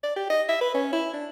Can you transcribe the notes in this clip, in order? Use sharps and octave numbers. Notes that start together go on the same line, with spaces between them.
D5
G4
D#5
E5
B4
C#4
E4
D4